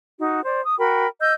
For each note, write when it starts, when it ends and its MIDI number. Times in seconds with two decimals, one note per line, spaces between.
0.19 0.43 63
0.19 0.43 66
0.44 0.60 72
0.44 0.60 74
0.65 0.77 87
0.78 1.06 66
0.78 1.06 70
0.78 1.06 79
0.78 1.06 83
1.19 1.33 75
1.19 1.33 88
1.19 1.33 91